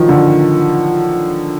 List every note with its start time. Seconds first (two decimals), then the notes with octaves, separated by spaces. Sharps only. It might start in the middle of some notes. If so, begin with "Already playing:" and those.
Already playing: D#3 F3 F#3
0.09 D3